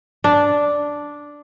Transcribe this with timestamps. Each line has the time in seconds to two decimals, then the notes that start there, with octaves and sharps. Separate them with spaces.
0.24 D4